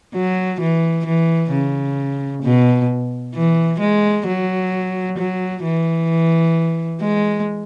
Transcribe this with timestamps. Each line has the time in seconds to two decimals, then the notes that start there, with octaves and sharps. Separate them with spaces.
0.14 F#3
0.61 E3
1.06 E3
1.52 C#3
2.43 B2
3.35 E3
3.80 G#3
4.27 F#3
5.18 F#3
5.64 E3
7.01 G#3